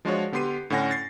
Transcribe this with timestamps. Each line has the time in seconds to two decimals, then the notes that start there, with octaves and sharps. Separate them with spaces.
0.05 F3 G#3 D4 F4 F#4 C#5
0.32 D3 B3 G4 C6 C7 D#7
0.70 A2 D3 C#4 F#5 G#5 A#6
0.91 A6 C7